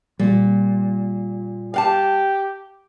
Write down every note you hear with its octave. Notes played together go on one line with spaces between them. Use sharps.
A#2 G3 G#3 A#3
G4 F5 F#5 A5